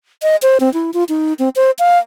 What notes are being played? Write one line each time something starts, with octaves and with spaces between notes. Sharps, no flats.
D#5
C5
C4
E4
F4
D#4
C4
C5
F5